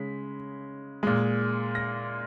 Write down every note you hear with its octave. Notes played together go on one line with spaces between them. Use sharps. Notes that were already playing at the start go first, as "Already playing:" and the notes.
Already playing: C#3 G#3 B6
A#2 G#3
A#6